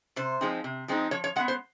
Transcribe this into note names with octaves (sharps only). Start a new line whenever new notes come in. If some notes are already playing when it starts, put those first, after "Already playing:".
C3 C5
F3 G#3 C4 D#4
C3
F3 G#3 C4 D#4
F3 C#5
C#5
G#3 B3 F#5
C5